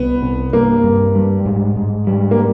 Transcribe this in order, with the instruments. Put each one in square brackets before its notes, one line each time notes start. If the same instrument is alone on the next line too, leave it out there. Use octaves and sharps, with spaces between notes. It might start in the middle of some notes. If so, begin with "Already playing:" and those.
Already playing: [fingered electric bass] C2 [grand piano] B3
[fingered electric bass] C3
[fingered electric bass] G2 [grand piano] A#3
[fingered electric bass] G2
G3
G#2
G#2
G3
[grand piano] A#3